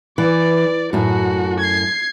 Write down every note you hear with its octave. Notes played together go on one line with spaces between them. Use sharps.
E3 D5
F#2 A2 F#4
G#6 C7